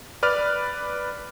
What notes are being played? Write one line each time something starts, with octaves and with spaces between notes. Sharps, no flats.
B4 D5 F6